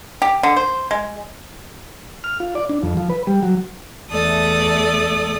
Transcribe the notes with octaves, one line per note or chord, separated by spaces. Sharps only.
G4
D3
C5
G#3
F6
F4
D5
D4
F2
F3
B4
G3
F#3
E2 A3 A4 D5 D#6